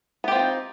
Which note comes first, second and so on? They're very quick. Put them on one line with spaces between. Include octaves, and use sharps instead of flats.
B3 G4 C4 F4 D#4